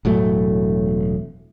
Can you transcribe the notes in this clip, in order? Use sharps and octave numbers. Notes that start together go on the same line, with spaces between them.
E1 A2 F#3 A3